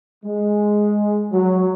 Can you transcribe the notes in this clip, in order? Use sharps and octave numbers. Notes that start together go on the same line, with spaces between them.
G#3
F#3